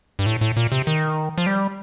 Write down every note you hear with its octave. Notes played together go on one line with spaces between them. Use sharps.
G2
A2
A2
A#2
C3
D#3
F3
G3